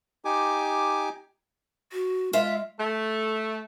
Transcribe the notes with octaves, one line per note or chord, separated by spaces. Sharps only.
D#4 G4 G#5 D6
F#4
G#3 F4 E5
A3